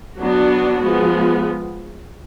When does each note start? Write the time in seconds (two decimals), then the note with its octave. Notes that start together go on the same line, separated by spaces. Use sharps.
0.18 F#3 B3 D4 F#4
0.82 F3 G#3 B3